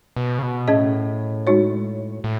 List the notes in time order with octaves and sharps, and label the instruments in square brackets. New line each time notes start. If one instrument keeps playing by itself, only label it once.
[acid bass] B2
C#3
B2
[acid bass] A2 [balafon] C#4 G#4 D#5
[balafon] G#3 D#4 F#4 C#5
[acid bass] A2